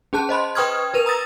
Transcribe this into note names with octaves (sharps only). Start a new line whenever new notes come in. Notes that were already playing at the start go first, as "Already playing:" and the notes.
C#4 G#4 A5 F#6
C5 D#5 B5 C6
B4 G5 C#6 D#6 F6 G#6
A#4 B4 D#7 F7
A#5 D#6 E6 A6 A#6